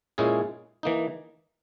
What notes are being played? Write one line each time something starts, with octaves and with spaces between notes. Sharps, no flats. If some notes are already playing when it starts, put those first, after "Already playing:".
A#2 G#3 C#4 E4 G#4
E3 A#3 D#4